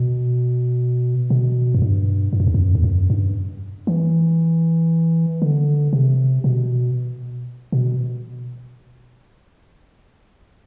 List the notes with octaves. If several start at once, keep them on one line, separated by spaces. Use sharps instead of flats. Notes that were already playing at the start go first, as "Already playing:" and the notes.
Already playing: B2
B2
F#2
G2
G2
F#2
E2
F#2
E2
F#2
G2
E3
D3
C3
B2
B2